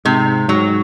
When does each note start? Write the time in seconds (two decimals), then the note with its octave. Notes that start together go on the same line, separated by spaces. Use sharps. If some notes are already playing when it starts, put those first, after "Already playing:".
0.05 G#2 C3
0.48 G#2 F#3